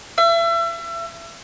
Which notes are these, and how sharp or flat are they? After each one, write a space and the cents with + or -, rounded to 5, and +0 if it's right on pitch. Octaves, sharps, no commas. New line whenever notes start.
E5 +35